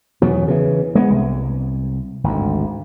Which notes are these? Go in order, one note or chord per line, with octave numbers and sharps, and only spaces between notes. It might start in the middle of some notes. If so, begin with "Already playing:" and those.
E2 B2 F#3
C#3 E3
G#3 A3 B3
C2
G#1 D2